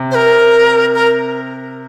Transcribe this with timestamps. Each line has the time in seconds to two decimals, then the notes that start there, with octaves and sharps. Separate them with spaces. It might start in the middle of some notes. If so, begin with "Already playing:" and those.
Already playing: C3
0.11 C5
0.15 A#4
0.94 A#4